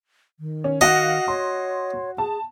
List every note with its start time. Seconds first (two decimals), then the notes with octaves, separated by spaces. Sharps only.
0.40 D#3
0.64 C#4
0.81 F#4 D#5 F5 F#5
1.28 C#5 C6
2.18 G#4 A5